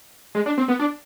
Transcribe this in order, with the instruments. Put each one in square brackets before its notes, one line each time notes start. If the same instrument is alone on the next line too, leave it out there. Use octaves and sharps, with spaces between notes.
[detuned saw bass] G#3
D4
C4
B3
D4